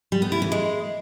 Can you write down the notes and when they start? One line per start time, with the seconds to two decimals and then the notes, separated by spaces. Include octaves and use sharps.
0.12 G3
0.22 B3
0.32 E4
0.42 E3
0.52 G#3